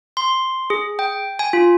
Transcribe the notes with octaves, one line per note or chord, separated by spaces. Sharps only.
C6
G#4
G5
G#5
F4